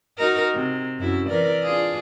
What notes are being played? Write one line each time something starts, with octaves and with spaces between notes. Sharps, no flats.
D#4 F#4 A#4
C3
F#2 E4
E3 A#4 D5
D4 F4 G#4